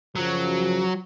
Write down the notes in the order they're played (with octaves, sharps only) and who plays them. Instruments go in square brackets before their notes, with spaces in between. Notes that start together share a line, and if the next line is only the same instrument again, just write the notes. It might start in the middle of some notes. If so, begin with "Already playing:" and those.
[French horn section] F#2 C#3 F3 [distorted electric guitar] F#3